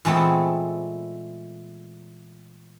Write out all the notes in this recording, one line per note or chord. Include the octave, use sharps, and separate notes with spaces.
A#2 E3 G#3 A3 B3 C4